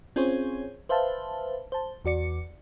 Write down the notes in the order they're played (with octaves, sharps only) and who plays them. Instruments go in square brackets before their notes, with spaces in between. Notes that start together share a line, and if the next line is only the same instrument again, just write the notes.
[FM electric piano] C4 C#4 F4 G#4 C5 C#5
B4 C5 E5 F5 A5
C5 A5
E2 F#4 D5 C#7